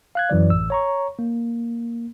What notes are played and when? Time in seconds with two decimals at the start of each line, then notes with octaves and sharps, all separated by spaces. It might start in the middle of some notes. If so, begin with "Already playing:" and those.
0.15 F5 F#6 G#6
0.30 F#2 E3 F#3 D5
0.50 A1 E6
0.70 C#5 A#5 C#6
1.19 A#3